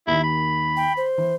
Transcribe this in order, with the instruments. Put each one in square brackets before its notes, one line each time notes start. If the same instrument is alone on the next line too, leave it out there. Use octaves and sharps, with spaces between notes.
[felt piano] D#2 D#3 [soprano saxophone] E4
[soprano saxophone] B5
[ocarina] G5
C5
[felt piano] E3